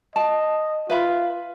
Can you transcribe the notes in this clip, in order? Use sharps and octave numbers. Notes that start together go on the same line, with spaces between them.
D#5 A5
F4 B4 E5 B5